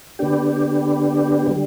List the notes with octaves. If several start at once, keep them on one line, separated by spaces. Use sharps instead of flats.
D3 B3 D4 G4
D3 G3